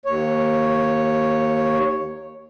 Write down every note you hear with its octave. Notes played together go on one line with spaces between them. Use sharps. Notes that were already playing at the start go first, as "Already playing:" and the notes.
D#2 C#5